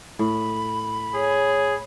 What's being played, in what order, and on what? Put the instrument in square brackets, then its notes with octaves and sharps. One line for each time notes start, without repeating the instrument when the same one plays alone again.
[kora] A2 [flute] B5
[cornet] G#4 [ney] C#5